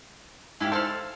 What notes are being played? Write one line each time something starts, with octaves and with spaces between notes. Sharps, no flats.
G#2 E4 G4 F5
A4 C5 D5 F5